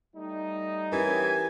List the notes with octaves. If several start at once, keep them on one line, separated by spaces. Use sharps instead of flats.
G3 A3 D#4
E3 C#4 G4 A#4 G#5